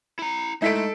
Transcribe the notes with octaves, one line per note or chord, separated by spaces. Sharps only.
E4 A#5
G#3 A3 D#4 E4 A4 B6 D7